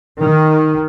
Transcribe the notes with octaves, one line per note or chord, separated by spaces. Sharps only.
D#3